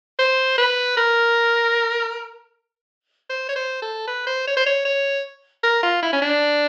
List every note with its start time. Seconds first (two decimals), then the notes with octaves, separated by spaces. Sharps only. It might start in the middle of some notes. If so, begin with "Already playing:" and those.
0.19 C5
0.58 B4
0.97 A#4
3.30 C5
3.49 C#5
3.56 C5
3.82 A4
4.07 B4
4.27 C5
4.47 C#5
4.57 C5
4.67 C#5
4.85 C#5
5.63 A#4
5.83 F4
6.03 E4
6.13 C#4
6.22 D4